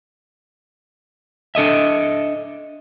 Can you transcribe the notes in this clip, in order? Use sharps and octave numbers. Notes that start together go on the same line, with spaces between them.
D4 A4 D#5 E5